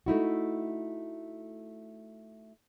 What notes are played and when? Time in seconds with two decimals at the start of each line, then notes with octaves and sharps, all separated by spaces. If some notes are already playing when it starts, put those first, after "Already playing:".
0.06 A3 D#4 E4 F#4